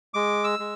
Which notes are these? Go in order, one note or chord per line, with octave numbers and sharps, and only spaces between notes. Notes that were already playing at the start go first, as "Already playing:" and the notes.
G#3 D6
E6
G#3